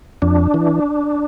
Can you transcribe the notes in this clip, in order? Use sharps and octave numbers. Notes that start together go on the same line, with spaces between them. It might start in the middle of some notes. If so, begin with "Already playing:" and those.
F2 D4
E3